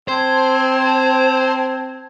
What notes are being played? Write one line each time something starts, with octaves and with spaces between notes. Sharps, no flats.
C4 C5 A5 G#6